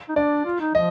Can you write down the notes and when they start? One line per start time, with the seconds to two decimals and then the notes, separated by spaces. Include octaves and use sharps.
0.09 D#4
0.16 D4 D5
0.45 F4
0.60 D#4
0.74 F3 D#5